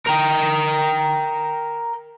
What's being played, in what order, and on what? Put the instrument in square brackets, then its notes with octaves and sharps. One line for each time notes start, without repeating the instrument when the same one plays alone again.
[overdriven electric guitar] A#4 G5